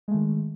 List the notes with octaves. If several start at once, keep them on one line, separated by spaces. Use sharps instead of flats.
D#3 G#3 A3